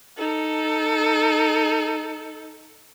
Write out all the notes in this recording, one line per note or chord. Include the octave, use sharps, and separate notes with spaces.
D#4 A4